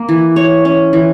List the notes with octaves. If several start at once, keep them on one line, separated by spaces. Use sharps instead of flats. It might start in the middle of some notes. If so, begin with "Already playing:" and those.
Already playing: A#3
E3
C#5
C#4
E3